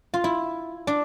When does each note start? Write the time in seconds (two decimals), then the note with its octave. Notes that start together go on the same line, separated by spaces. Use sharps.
0.14 F4
0.24 E4
0.87 D4